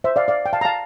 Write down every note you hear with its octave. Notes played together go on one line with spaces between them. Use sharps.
C5 E5
D5 F5
D5 F5
G5
F5 A5
A#5
F5 A5